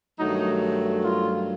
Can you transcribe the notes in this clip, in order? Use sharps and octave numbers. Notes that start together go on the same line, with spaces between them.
G2 D#3 F#3 A3 D#4
F4